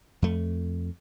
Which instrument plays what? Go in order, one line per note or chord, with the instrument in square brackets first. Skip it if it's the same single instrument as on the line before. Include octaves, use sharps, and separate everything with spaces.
[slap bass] F2 A3